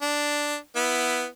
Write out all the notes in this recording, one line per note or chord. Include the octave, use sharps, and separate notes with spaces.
D4
B3 E4